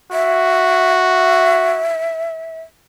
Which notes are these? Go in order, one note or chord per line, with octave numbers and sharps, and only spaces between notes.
F#4 E5